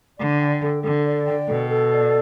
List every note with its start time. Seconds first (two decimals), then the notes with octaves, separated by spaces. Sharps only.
0.18 D3 D5
0.39 G5
0.62 A4
0.83 D3 A4
1.05 D5
1.26 G5
1.47 B2 A4
1.69 A4
1.91 D5